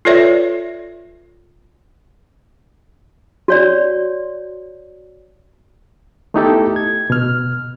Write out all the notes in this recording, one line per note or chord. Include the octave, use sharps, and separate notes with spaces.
F4 A4 B4 C#5 D5 E5
F#4 C#5 D5
A3 B3 D#4 E4 G4 A4
G#6
B2 F6